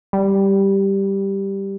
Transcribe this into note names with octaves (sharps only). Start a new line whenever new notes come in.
G3